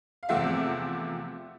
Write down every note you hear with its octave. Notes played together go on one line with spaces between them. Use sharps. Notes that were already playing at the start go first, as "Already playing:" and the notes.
F5
E2 C3 F3 A3 C4 E5 F#5